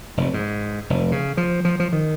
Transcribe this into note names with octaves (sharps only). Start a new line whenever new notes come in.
F1
G#2
F1
C#3
F3
F3
F3
D#3